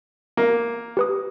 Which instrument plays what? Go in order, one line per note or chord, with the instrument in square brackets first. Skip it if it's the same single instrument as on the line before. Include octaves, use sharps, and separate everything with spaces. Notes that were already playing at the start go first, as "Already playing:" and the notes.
[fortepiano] A#3
[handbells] G4 B4 D#6